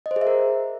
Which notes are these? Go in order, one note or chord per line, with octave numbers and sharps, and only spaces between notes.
D#5
C5
G#4
E5
A#4